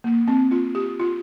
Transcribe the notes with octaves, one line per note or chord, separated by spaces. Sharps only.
A#3
C4
F4
G4
F4